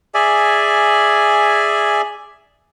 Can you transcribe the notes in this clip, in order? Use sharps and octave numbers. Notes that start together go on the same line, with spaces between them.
G#4 D5 E5 G#5